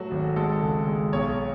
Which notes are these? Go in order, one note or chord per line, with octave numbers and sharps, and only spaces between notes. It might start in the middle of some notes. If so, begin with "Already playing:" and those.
Already playing: F#3 A3 F#4
G#1
G#3 A4
C#2
G#3
B1 C#5